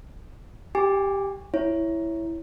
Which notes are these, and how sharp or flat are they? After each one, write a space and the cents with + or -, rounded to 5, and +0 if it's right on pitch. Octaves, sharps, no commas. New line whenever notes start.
G4 +0 G#5 -35 D6 +0
E4 +0 C#5 +0